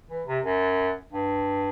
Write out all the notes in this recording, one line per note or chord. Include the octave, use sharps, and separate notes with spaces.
E3
C3
F#2
G2